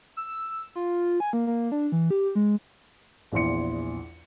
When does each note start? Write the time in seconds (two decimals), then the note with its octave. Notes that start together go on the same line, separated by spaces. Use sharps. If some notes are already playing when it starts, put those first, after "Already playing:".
0.17 E6
0.75 F4
1.20 G#5
1.33 A#3
1.47 A#3
1.72 D4
1.92 E3
2.10 G4
2.35 G#3
3.32 A#1 E2 E4 C6 C#7